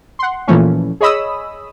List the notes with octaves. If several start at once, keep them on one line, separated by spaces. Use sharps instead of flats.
F#5 C6
A#2 E3 F3 A3 C#4
G#4 C#5 D#5 B5 D#6 E6